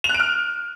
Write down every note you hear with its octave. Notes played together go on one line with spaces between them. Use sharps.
F7
F#6
D7
F6